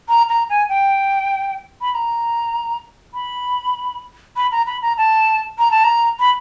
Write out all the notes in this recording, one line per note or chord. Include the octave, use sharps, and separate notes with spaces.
A#5
A#5
G#5
G5
B5
B5
A#5
B5
B5
A#5
B5
A#5
A5
A#5
A5
A#5
B5